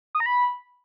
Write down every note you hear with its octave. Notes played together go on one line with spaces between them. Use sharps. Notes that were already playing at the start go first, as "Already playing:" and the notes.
D#6
A#5
B5